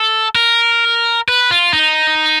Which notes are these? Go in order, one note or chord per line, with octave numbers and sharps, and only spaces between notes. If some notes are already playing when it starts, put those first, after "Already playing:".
Already playing: A4
A#4
B4
F4
D#4